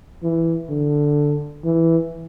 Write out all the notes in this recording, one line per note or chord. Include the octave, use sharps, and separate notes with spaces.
E3
D3
E3